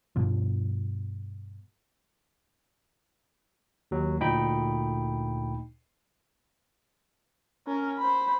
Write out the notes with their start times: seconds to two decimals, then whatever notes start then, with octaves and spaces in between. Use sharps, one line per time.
0.16 G2 B2 F3
3.91 D#2 F#3
4.20 D2 A#2 D#4 G5 B5
7.67 C#4 A#4
7.98 C5 B5